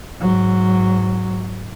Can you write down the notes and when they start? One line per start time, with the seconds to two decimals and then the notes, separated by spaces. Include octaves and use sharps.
0.20 G#2 F#3